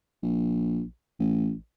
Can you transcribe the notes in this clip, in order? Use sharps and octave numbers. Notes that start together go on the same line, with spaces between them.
A#1
A1